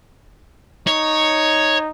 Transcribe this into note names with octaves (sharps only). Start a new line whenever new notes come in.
D#4 C#5